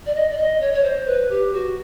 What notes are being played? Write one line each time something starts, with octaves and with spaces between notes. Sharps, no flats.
D5
D#5
D5
D#5
C#5
C#5
C5
B4
G4
F#4